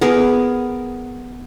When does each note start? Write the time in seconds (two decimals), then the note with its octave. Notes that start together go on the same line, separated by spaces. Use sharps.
0.01 B3 G#4 A#4